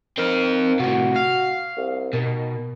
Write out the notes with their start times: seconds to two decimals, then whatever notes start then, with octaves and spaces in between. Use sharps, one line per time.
0.18 D#3 C4 F5
0.80 A2 C3 F#4
1.16 F5
1.77 C2
2.13 B2 D#3